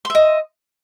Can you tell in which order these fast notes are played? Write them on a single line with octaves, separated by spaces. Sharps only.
C6 E5 D#5